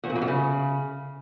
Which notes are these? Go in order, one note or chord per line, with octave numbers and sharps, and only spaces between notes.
E2
A#2
F2
F#2
C#3